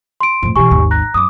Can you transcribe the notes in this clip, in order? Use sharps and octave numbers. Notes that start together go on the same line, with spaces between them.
C6 D7
F2 A2
B2 E3 G4 G#5 C#6
G#1 D#2
A#5 F#6 A#6
F#2 D6 D#6